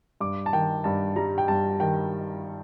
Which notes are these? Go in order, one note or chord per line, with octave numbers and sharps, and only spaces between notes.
G2 D6
A5
D#3 G5
G2 A5
G3 A#5
G5
G2 A5
D#3 G5